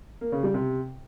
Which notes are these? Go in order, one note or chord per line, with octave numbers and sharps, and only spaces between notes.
A#3
C#3
G3
C3